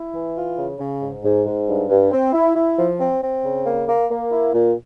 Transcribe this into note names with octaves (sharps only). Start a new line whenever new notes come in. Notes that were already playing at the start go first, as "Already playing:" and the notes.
Already playing: E4
E3
F4
C#3
C#3
G#2
G#2
G#2
G2
G2
C4
E4
E4
F3
C4
C4
C#3
A#3
A#3
A#3
E4
A#2